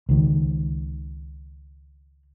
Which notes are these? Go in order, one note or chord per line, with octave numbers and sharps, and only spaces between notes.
C#2 D#3